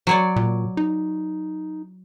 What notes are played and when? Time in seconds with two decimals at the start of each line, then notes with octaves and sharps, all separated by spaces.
0.07 F#3 C#5 D5
0.36 A#2
0.77 D#4